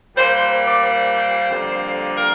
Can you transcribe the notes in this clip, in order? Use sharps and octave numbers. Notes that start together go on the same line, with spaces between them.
A#2 G3 A#3 C5
C5
D5
C5
F2 D3 G3 A#3
A#4